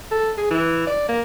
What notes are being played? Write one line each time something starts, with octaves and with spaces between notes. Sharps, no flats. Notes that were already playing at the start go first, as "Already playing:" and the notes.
A4
G#4
E3
D5
A#3